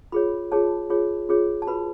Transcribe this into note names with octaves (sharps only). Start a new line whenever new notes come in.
F4 G#4 C#5 B5
F4 G#4 C#5 A5
F4 G#4 C#5
F4 G#4 C#5
A5
F#4 B4 B5